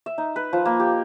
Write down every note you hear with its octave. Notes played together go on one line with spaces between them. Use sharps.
E5
D#4
B4
F3
A#3
G4